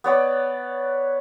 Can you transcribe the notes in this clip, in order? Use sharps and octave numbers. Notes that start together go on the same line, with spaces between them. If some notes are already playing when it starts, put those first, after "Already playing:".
B3 C#5 D5